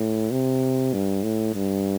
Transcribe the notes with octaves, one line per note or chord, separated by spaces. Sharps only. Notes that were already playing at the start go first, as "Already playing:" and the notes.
Already playing: A2
C3
G2
A2
G2